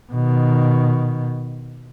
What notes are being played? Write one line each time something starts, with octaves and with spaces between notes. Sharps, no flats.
B2 D#3